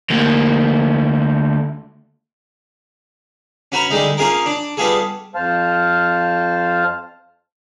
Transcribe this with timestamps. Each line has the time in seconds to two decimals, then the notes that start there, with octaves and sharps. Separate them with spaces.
0.10 D2 A#3
3.72 C#4 F#4 B4 A#5
3.90 D3 G3 G#3 D#4
4.17 A#3 C#4 F4 G#4 A#4
4.46 D4
4.77 G3 B3 F4 G#4 A4
5.35 F2 C5 F5 A5 F6